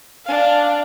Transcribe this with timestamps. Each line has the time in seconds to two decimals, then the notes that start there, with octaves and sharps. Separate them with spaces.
0.25 D4 F5